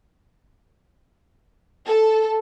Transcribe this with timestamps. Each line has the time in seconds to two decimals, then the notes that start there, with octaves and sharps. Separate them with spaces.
1.87 A4